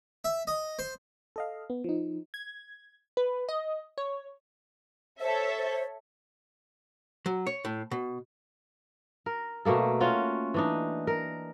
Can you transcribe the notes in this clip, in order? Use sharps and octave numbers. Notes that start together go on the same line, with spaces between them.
E5
D#5
C5
A4 D#5 F5
B3
F3 D#4
G#6
B4
D#5
C#5
A4 C5 C#5 E5
C5
F#3
C#5
A2
B2
A#4
B2 A3 A#3 A4
C#4 F4 F#4
E3 D4 D#4
A#4